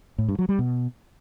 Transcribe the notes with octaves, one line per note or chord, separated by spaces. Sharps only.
A2
G2
F#3
G3
B2